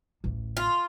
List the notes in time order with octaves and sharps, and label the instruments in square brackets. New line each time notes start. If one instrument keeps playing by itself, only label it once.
[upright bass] A1 D2
[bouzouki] F4